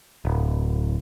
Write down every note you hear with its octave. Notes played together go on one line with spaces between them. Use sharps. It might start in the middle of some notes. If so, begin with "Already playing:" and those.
D1